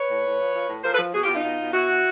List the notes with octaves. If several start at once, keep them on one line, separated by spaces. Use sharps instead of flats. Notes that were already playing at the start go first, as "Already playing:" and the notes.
Already playing: B4 C#5
A2
A2
F3
F3
A2
F3 A#4 C5
A4 B4
F3
B2 F#4 G#4
F4 G4
B2
D#4 F4
B2
B2
B2 E4 F#4
B2